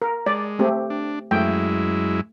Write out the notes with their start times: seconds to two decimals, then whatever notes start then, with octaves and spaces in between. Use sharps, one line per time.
0.02 A#4
0.26 G#3 D5
0.59 A3 C4 G4
0.90 D4
1.31 F#2 G#3 A3 E4 G5